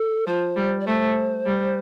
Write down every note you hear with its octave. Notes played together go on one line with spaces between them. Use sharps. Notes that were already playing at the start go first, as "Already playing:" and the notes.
Already playing: A4
F3 C5
G3
D5
A3 C5
G3